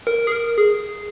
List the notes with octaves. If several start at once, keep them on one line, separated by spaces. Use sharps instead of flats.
A#4
G#4
A#4
G#4